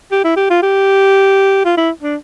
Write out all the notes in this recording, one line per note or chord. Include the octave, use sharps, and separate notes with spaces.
G4
E4
G4
F4
G4
F4
E4
D4